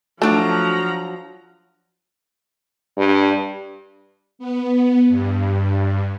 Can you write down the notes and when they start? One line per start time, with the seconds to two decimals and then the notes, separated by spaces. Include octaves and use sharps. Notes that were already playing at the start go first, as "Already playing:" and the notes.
0.22 F3 F#3 A3 D4 F#4 A5 A#5
2.97 G2
4.39 B3
5.09 G2